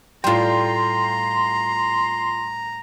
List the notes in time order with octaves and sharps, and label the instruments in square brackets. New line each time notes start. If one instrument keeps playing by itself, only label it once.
[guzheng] A2 G3 [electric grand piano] F4 G5 [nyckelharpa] A#5 [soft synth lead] C6